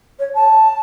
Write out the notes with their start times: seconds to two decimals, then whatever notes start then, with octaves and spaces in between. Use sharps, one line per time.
0.19 C#5
0.35 A5